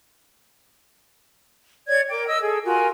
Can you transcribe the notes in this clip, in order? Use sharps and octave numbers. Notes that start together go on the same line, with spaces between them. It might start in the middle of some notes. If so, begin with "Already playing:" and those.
C#5 D5 G#6
A#4 G5 D6
D#5 E6
G#4 A4
F4 F#4 A#4 G#5